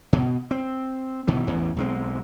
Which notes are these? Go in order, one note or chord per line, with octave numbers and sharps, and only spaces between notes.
B2
C4
B2 D#3 E3
A1 E2 E3
B1 G#3 C4